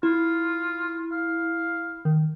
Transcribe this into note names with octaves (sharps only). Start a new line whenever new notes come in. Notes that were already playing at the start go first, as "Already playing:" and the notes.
E4 F4
F5
D#3